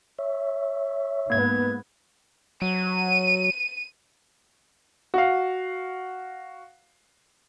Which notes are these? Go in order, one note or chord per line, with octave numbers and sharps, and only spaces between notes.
C#5 E5
G#2 A#3 B3 G#6
F#3 D#7
F#4 F5